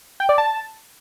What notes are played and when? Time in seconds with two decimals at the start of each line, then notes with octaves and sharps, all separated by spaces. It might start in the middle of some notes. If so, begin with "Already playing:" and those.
0.20 G5
0.29 D5
0.38 A5